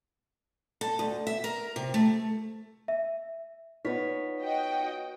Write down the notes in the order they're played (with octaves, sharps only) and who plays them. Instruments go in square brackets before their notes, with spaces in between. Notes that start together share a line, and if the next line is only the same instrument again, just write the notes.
[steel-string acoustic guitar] A4
D2
E5
A#4
C3
A3
[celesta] E5
[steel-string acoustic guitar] B3 C#5 [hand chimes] D#4 F4 B6
[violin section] F#4 D#5 G5